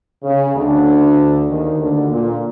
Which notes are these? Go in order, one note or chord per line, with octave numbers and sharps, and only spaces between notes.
C#3
D2 D3
D#2 D#3
D2 D3
A#2